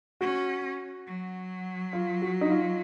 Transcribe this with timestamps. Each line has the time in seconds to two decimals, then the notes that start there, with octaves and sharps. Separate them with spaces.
0.21 C#4 F#4
1.07 F#3
1.93 F4
2.22 F#4
2.41 D#4
2.50 F4